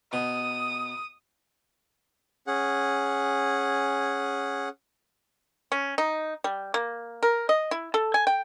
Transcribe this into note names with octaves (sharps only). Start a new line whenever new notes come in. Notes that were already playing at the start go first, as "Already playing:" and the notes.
B2 D#6
C#4 G#4 F#5
C#4
D#4
G3
A#3
A#4
D#5
E4
A4
G#5
G5